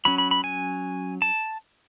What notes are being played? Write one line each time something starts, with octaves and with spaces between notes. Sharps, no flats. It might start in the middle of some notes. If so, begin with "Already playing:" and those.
F#3 C#4 B5
B5
B5
G#5
A5